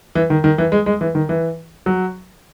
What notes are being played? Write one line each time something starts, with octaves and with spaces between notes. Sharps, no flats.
E3
D#3
D#3
E3
G#3
G#3
E3
D#3
E3
F#3